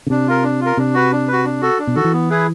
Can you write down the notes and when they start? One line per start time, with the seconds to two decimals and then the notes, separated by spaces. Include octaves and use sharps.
0.07 C#3
0.10 C3 D4
0.28 F4 A#4
0.44 D4
0.61 F4
0.66 A#4
0.77 C3 D4
0.94 F#4 B4
1.12 D4
1.28 F#4 B4
1.45 D4
1.61 F#4 A4
1.79 D4
1.87 B2
1.96 D#3 F#4 A4
2.04 E3
2.12 B3
2.30 E4 G#4 B4